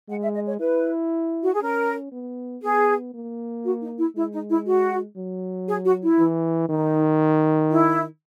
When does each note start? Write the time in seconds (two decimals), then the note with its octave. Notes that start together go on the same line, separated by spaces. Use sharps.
0.09 G#3 F#5
0.21 E5
0.34 D#5
0.47 C#5
0.60 E4 B4
1.42 F#4
1.53 G#4
1.61 C#4 A#4
2.12 B3
2.63 B3 G#4
3.14 A#3
3.65 F#4
3.81 D#4
3.98 E4
4.15 G#3 E4
4.32 D#4
4.50 E4
4.66 F#4
5.16 F#3
5.68 G#4
5.85 F#4
6.02 E4
6.18 E3
6.69 D#3 D#4
7.71 E4